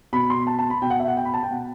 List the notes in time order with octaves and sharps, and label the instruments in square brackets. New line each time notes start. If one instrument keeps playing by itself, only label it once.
[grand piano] B2 B5
C6
A5
A5
B5
B2 G5
F#5
E5
F#5
G5
B5
A5
G5
B2 F#5